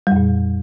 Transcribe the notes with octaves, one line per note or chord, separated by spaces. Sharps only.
F2 A#2 G3